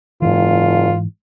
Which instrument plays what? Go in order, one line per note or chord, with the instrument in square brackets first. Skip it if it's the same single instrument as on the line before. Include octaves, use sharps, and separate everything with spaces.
[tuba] F#1 [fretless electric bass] G#2 E3 [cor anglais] F4